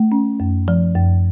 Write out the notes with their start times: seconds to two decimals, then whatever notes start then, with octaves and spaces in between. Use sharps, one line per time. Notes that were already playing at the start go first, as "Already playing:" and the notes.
Already playing: A3
0.12 C#4
0.40 F#2
0.68 F3
0.95 F#2